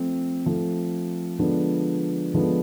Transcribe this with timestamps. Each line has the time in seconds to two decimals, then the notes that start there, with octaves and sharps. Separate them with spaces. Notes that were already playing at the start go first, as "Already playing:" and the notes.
Already playing: F3 A3 C4
0.46 F3 A3 C4
1.39 D3 F3 G#3 B3 D4
2.34 D3 F3 G#3 B3 D4